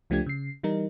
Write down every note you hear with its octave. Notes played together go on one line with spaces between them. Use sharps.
C#2 F3 A3 D4 G4 G#6
C#3 C7
E3 G3 D#4 A#4